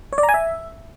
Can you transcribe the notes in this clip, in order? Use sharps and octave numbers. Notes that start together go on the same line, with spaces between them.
C#5
D5
A#5
G#5
E5